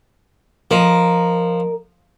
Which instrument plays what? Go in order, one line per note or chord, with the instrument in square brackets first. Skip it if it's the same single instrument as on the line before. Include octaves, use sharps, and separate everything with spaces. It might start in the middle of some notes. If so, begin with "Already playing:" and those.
[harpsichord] F3 [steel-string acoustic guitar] A#4 D#5